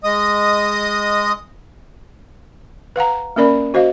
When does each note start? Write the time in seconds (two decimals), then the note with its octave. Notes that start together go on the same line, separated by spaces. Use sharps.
0.04 G#3 D#5 D#6
2.96 B4 F5 F#5 A#5
3.36 A#3 C#4 A#4 D5 B5
3.74 F#4 C5 D#5 F5